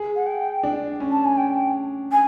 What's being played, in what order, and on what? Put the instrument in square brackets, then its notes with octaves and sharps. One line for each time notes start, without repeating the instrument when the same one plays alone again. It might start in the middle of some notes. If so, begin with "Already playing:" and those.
Already playing: [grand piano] G#4
[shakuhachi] F#5
G5
[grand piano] D4
C#4
[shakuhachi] A5
G#5
G5
G#5